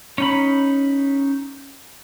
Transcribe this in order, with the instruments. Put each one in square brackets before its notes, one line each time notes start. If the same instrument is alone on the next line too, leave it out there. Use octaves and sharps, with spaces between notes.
[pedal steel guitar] C#4 D#4 B5